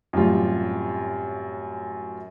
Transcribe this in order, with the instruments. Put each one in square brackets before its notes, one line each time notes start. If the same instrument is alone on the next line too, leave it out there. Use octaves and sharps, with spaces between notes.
[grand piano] F#2 A2 C3 E3 G3 F4